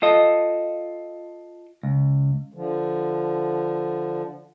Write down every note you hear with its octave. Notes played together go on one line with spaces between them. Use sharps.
F4 A4 D#5
C#2
D3 F3